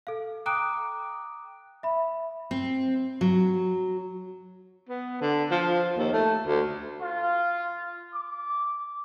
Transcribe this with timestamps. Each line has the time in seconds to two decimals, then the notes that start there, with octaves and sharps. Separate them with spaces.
0.07 A4 F5
0.46 G5 A#5 D6 D#6 F#6 D7
1.83 E5 B5
2.51 C4
3.21 F#3
4.89 B3
5.21 D3
5.51 F3
5.98 D#2
6.13 A3
6.47 D2
7.02 F4
8.13 D6